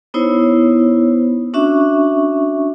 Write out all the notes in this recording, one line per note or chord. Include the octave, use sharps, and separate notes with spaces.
B3 D#4 E4 C5 C#5
C#4 D4 F#4 E5 C#6